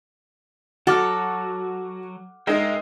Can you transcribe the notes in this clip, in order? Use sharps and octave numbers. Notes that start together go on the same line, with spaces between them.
F#3 F#4 A4 F#5 D6 F6
G#3 D#4 A#4 E5 G5